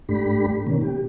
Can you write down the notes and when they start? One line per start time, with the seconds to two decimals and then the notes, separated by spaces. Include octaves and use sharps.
0.09 G#2 A3 D4 G4 B5
0.67 B2 D#3 A#3 C#4
0.81 G4